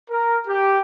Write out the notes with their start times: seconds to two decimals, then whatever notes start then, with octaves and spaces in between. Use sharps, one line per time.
0.10 A#4
0.48 G4